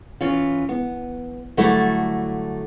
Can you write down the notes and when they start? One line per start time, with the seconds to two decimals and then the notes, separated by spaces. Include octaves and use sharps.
0.21 E3 C#4 F4
0.69 B3
1.57 D3 F#3 G3 A3 E4 A4